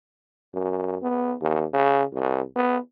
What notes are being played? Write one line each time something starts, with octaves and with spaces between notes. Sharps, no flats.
F#2
B3
D#2
C#3
C2
B3